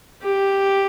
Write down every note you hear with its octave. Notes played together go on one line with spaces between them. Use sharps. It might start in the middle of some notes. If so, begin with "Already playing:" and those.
G4